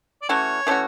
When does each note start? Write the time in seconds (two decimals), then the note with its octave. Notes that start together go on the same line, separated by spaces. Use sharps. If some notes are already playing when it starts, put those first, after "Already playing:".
0.22 D5
0.29 E3 A3 C#4 F#4 C#5
0.67 E3 A3 C#4 F#4